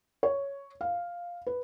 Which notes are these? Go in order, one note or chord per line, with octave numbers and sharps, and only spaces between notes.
C#5
F5
B4